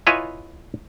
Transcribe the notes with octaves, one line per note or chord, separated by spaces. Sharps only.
E4 F4 B4 C#5 D#5 G#5